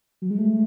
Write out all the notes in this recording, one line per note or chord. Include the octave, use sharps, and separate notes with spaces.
F#3
G#3
A3